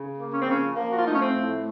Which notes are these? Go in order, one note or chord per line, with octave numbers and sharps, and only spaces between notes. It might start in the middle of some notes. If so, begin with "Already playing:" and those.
Already playing: C#3
A#3
C#4
C4
C#3 F3 C#4
F3 A#3
F#4
F4
A3 D#4
C#4
C4
A2